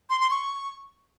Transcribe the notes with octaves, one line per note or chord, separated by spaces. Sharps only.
C6
C6
C#6